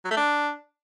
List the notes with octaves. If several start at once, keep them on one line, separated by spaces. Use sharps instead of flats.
F#3
A3
D4